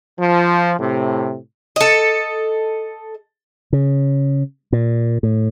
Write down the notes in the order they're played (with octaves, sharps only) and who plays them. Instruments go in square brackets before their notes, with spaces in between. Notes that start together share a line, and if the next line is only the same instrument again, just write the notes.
[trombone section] F3
A2 C3
[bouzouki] A4 D#5
[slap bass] C#3
A#2
A2